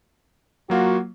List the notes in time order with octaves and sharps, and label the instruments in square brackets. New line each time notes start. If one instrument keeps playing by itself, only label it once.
[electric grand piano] F#3 A#3 F4 [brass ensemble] F#4